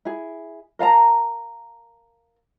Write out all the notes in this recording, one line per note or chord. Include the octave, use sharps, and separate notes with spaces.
E4 G#4
A#4 F5 A5 A#5